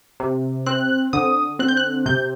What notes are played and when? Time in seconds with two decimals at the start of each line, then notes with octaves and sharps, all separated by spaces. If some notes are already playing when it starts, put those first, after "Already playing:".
0.20 C3
0.66 C4 F#6
1.13 D3 D#6
1.59 C4 F#6
1.68 G6
1.77 F#6
2.06 C3 G6